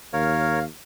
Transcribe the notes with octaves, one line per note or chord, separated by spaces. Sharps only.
D#2 A#4 C#5 F5